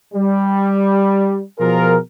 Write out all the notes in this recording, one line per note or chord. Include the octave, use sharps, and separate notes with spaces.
G3
B2 F3 F4 G#4 A#4